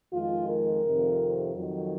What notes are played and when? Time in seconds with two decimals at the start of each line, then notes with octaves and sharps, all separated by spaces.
0.12 F2 D#3 G#3 F4
0.48 A#4
0.84 F2 C3 D#3
1.54 F2 D#3 F#3